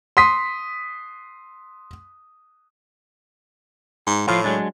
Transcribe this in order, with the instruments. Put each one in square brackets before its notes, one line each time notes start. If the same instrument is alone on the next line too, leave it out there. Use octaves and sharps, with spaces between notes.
[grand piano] C6 D#6 B6
[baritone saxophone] G#2
[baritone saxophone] A2 [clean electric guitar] F3 F4
[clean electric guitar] F#3 G#3 D4